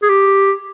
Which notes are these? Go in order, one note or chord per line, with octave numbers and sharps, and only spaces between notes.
G#4
G4